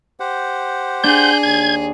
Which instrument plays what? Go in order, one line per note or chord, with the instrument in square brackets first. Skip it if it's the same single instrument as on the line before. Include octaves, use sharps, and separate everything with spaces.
[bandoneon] G4 C5 F#5
[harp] D4 [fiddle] G#4 [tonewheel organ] G6
[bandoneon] D#2 [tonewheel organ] G#6